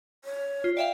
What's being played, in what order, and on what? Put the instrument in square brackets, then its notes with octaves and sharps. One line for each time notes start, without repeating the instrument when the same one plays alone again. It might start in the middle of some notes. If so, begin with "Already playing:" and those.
[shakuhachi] C#5
[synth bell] F4
[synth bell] D5 E5 F5 [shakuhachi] G5